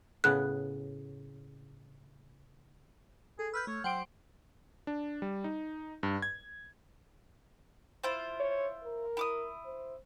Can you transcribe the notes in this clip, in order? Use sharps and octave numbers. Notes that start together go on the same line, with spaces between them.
A2 C#3 B3 F#6
G#4 A4
B4 E6 F6 G6
A3 C#5
F#3 C5 F#5 G5 D6 D7
D4
G3
D#4
G2
G#6
E4 F4 C5
C#5
A#4
E4 D6 D#6
C5